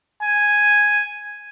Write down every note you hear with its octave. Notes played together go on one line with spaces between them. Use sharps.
G#5